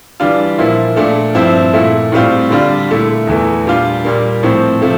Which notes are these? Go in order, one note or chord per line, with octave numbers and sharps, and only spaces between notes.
E3 G3 D4 F4
A#2 F3 A#3 E4
A#2 A3 D4
G2 F3 C4 E4
A#2 A3 E4
A2 G3 C4 F4
D3 G3 D4 F4
A#2 A3 E4
E2 E3 A3
A#2 G3 D4 F4
A#2 G3 A#3
A2 F3 C4
C3 F3 A3